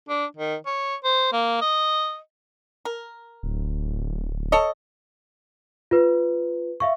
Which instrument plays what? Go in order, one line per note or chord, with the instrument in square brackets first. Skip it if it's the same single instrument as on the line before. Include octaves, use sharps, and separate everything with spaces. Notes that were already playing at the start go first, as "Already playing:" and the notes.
[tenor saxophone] D4
D#3
C#5
C5
A#3
D#5
[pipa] A#4
[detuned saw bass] D1
[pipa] A4 C#5 D#5
[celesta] F4 B4
E5 F5 C#6